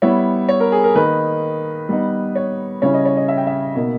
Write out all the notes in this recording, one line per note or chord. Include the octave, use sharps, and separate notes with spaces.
G3 B3 E4 C#5
C#5
A#4
G#4
A#4
D#3 A#3 D#4 B4
G3 B3 D#4
C#5
C#3 G3 C#4 E4 C#5
D#5
C#5
D#5
E5
G5
E5
B2 A#3 D#4